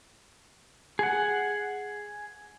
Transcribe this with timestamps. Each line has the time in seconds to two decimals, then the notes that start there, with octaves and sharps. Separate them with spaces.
0.99 G#4 F#5